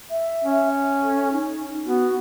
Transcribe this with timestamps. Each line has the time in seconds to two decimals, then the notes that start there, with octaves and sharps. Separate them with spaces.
0.10 E5
0.45 C#4
1.02 A4
1.32 D#4
1.86 B3 F#4